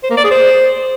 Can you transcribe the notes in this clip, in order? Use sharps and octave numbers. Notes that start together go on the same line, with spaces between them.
C5
A#3
D5
G#4
C5